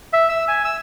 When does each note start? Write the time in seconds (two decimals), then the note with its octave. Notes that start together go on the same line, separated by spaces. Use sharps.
0.13 E5
0.29 E6
0.48 G#5
0.65 E6